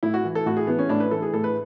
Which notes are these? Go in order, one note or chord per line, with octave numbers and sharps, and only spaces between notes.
A2 E4
F#4
E3
A4
A2 F#4
G#4
E3 B3
C#4
A2 D4
B4
E3 A4
G#4
A2 A4
B4